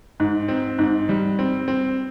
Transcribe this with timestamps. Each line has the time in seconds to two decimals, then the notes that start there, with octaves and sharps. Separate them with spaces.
0.20 G#2
0.48 C4
0.79 G#2
1.09 G3
1.39 C4
1.68 C4